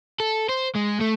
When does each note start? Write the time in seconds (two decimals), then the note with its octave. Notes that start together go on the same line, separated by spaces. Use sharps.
0.20 A4
0.49 C5
0.76 G#3
1.01 A3